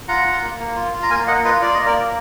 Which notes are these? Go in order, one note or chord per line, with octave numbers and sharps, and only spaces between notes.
F4 F#5 A#5
F4
A#3
A#3
F4
F4
A#5
A#3 F5 G#5
A#3 D#5 F#5
F4 B4 D#5
F4 D5
A#3 D#5
A#4 D5
A#3